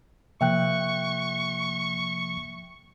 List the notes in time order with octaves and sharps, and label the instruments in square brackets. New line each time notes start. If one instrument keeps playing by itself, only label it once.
[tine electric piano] C3 F3 A#3 [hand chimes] E5 G5 F#6 [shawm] C#6